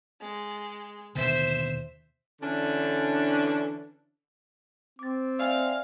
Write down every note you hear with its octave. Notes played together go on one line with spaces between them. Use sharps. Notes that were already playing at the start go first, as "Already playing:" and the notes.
G#3
D#2 B2 D3 C5 E5
D3 E3 C#4 D4
C4 D6 A6
D5 E5 F5 G#5